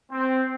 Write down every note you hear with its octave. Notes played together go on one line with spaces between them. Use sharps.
C4